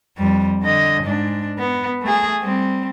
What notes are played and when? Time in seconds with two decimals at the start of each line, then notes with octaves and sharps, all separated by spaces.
0.18 F2 G3
0.62 D3 D#5
1.04 G#2 D4
1.59 B3
2.02 A3 G#4
2.41 G3 C4